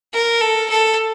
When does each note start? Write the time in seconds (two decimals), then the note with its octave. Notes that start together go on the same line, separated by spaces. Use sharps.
0.13 A#4
0.41 A4
0.70 A4